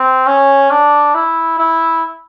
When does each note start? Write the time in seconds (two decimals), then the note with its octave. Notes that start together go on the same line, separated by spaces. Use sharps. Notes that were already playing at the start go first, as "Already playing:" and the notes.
Already playing: C4
0.27 C#4
0.70 D4
1.15 E4
1.59 E4